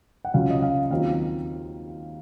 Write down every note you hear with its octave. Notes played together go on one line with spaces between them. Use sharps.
F#5
C#2 C#3 F#3 C#4 F4 F5
D#5
F5
D#2 D#3 F#3 C4 F4 F5